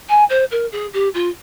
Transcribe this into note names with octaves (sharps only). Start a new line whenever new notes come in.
G#5
C5
A#4
G#4
G4
F4